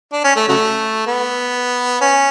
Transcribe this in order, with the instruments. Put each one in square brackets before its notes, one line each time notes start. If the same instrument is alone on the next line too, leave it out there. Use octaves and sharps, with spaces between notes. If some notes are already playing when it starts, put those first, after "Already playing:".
[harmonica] D4
C#4
A3
C#3 F#3 A3
B3
C#4